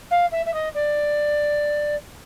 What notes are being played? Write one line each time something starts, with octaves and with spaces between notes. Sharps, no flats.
F5
E5
E5
D#5
D5